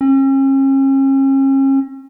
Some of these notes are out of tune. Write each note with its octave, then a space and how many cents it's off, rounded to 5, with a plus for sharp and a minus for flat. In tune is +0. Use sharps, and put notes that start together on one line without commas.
C#4 -40